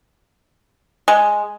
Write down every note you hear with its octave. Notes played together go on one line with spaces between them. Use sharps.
G#3